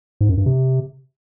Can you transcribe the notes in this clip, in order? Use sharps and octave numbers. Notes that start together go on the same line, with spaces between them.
G#2
F#2
G2
C3